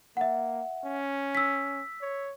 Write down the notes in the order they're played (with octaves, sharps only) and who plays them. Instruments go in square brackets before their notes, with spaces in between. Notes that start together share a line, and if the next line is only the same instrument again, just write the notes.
[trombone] A#3 [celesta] E5 F#5
[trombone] C#4
[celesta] E6 B6
[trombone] C#5